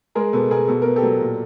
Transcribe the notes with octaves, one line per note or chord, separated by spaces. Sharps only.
G#3 G#4 A#4
B2 A4 B4
B2 G#4 A#4
B2 A4
B3 A#4
G4 A4
F#3
A#2